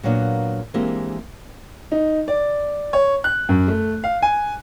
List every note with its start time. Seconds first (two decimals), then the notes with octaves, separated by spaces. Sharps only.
0.03 A#2 F#3 A#3 B3 D4
0.74 E3 G#3 A#3 C4 D4 G4
1.92 D#4
2.28 D5
2.93 C#5
3.24 F#6
3.49 F#2
3.68 A3
4.04 F5
4.22 G#5